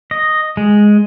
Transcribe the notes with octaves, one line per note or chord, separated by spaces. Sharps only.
D#5
G#3